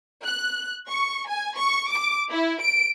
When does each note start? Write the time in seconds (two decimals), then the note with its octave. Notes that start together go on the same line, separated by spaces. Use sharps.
0.25 F#6
0.88 C#6
1.28 G#5
1.58 C#6
1.90 D6
2.29 E4
2.61 D7